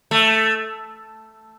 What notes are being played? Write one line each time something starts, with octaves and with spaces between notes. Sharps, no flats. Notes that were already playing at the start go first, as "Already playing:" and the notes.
A3